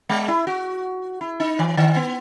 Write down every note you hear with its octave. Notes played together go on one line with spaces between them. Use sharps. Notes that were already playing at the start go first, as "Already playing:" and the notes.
G#3
E4
F#4
E4
D#4
E3
D#3
B3